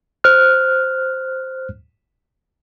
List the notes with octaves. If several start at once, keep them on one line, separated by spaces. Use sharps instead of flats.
C5 F6 F#6